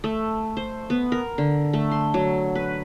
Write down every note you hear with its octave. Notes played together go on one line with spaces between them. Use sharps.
A3
C5
B3
A#4
D3
A3
C6
F#3
B4